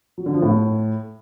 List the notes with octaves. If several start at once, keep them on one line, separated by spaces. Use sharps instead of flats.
F#3
D3
F3
A2